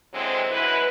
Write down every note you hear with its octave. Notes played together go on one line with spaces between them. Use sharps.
D3 E3 F#3 G#3 C4
F#2 G#3 E4 B4